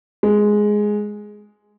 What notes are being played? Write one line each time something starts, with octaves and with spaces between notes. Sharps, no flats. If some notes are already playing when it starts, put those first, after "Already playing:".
G#3